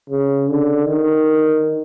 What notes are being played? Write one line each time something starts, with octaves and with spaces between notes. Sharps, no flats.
C#3
D3
D#3